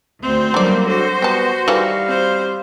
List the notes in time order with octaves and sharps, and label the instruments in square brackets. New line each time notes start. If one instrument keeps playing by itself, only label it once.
[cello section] D2 [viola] C4 C5
[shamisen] D3 D5 [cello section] F#3 G3 A#3
[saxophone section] F#3 D4 A4 [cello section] F#4 [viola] C5
[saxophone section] G3 B3 [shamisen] G5 A5
[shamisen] D#3 E3 A4 [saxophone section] G3 F5
[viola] C4 C5